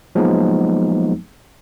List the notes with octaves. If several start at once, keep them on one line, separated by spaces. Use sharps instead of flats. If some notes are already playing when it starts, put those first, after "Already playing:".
F3 F#3 G#3 A#3 B3 D#4